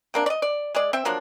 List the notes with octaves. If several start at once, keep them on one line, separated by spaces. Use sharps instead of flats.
C3 A#3 D4
D5 D#5
D5
G#3 G#4 D5
C4 E5 G5
F3 F#3 A#3 D4